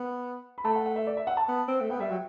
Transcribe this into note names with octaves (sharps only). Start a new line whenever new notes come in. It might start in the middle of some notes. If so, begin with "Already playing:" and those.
Already playing: B3
B5
A3 A5
F#5
F#5
E5
D5
E5
F#5
A5
B3
C4
A3
B3 G5
G3 E5
F#3 G5